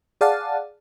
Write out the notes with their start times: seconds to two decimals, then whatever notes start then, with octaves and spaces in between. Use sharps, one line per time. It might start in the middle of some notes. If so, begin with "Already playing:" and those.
0.21 G#4 D5 F5 F#5 A5